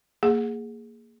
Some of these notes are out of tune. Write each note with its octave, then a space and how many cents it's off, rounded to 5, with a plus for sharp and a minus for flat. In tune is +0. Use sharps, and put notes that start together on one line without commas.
A#3 -15 G#4 +0 F#5 +5